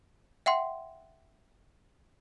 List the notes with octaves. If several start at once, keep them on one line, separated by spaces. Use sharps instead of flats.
E5 F#5 G5 C6